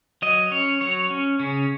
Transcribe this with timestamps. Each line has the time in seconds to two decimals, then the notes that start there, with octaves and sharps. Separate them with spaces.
0.22 F#3 D#5
0.51 C#4 C#5
0.81 F#3 C#5
1.11 C#4
1.39 C#3 C#4